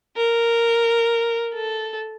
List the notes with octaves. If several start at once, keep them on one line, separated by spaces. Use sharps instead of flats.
A#4
A4